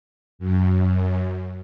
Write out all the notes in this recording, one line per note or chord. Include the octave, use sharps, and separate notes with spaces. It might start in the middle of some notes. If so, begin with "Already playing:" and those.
F#2